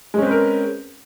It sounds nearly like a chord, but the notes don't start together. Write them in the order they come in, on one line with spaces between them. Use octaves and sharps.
G#3 C#4 C4 B4 A#4